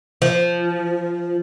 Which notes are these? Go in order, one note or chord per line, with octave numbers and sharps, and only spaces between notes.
F3